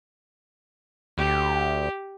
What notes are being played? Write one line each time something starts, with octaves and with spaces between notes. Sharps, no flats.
D2 G4